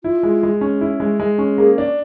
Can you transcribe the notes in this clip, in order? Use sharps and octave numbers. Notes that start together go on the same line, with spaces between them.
E4 F4
G#3
G#3
C#4
E4
G#3
G#3
C#4
A#3 G#4
D4